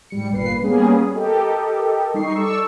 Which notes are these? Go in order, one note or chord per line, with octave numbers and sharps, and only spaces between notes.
G#2 G3 C#7
G1 A#2 B4 C7
G3 A#3 B3 C#4 G#4
G4 A4 A#4 D#5
G3 D#4 C#6 C7
A4 D5 C#6 E6